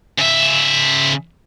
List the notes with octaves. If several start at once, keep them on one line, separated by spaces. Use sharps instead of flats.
C#3 E5